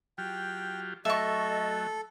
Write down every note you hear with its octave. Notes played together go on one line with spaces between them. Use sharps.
F#3 F4 G4 G5
F#3 A3 A4 D#5 E5 C#6